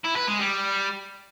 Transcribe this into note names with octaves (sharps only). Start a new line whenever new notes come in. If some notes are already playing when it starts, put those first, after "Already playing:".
E4
B4
G#3
G3